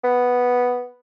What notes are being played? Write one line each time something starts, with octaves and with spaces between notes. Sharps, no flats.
B3